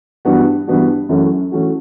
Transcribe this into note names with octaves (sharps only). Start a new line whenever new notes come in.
G2 E3 B3 D4 F#4
G2 E3 B3 D4 F#4
F#2 E3 A3 C#4 F#4
E3 A3 C#4 F#4